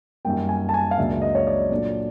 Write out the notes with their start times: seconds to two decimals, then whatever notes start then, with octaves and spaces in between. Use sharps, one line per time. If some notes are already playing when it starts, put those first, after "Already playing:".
0.25 F#2 D#3 G3 A#3 G5
0.49 G#5
0.69 A5
0.74 G#5
0.91 F5
0.98 C#2 C#3 F#3 A#3 D4 E5
1.22 D#5
1.35 C#5
1.47 D5
1.71 A#2 F#3 A3 D4